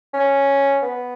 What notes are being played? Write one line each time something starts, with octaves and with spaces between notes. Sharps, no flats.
C#4
B3